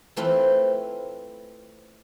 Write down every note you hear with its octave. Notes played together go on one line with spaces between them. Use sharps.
E3 A3 C4 F4 B4